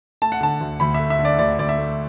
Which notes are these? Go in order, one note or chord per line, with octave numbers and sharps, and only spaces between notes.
A3 A5
F#5
D3 A5
D2
D2 B5
E5
A3
E5
D3
D5
D2 D5
D2 D5
E5
A3